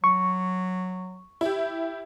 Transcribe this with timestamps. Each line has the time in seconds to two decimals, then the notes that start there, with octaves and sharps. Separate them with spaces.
0.04 F#3 C#6
1.41 E4 G4